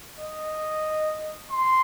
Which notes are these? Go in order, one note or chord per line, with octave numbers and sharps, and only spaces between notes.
D#5
C6